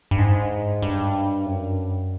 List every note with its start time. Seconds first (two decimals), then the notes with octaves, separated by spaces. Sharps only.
0.11 G2
0.19 G#2
0.82 G2
1.46 F#2